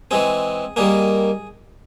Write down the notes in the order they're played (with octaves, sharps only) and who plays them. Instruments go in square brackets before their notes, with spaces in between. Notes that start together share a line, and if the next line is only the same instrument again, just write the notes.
[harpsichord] E3 G#3 C4 G#4
D#3 G3 A#3 G#4